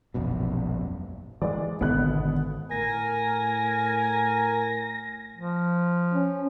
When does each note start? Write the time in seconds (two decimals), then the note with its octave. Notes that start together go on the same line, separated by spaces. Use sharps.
0.14 E1 A#1 F#2 B2
1.42 E3 F3 G#3 D5
1.81 G#1 B2 D3 B3 F#6
2.71 A2 A#4 G#5 A#6
5.37 F3
6.14 C#4